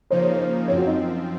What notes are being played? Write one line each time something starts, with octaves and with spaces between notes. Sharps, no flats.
C#3 F3 A#3 D#4 C5
C#5
C5
F#2 F3 C4 C#5
F#4
D#4